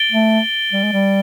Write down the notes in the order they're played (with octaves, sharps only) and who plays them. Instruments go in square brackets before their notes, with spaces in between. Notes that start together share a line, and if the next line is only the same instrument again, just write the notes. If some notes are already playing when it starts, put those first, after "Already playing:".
Already playing: [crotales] A6 D7 G7
[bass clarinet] A3
G3
G#3
G3